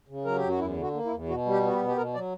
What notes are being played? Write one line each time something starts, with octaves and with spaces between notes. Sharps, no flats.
C#3
F#3 A#4
G4
F#2
F#4
E2 E4
D3
F#4
A#3
E4
E2
B2 F#4
G3
G4
B3
F#4
G4
B2
G4
B2 A#4
F#3 D5